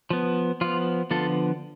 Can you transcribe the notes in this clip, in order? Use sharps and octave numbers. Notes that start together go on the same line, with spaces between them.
F3 B3
F3 B3 F4
D3 F3 B3 F4 A4